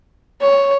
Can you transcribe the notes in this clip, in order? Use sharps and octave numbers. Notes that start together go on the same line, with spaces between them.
C#5